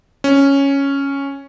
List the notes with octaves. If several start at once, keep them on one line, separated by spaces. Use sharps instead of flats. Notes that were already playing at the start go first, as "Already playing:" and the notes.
C#4